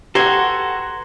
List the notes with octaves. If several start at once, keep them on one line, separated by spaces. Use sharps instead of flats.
F#4 G4 A4 B4 F#5 A#5 C6 G#6